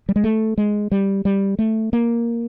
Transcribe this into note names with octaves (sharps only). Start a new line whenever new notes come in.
G3
G#3
A3
G#3
G3
G3
A3
A#3